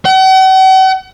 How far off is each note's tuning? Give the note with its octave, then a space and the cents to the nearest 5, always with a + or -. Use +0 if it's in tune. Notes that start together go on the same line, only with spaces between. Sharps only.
F#5 +45